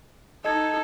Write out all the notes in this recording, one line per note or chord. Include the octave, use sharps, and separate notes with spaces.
D#4 A4 D#5 G#6